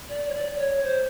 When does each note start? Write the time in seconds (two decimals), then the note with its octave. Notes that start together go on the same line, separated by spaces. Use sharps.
0.08 D5
0.29 C#5
0.34 D5
0.58 C#5
0.83 C5